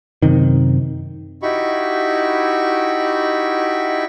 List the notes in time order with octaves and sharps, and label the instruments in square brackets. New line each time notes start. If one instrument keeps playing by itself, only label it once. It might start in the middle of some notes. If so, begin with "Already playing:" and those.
[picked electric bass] F#2 C3 D#3
[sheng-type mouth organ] D#4 E4 F#4 G4 B5 C#6